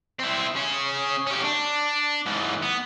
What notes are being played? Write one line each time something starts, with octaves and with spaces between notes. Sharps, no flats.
C4 E4
C#4 G#4
C#4 G4
D4
G#2 E3
B3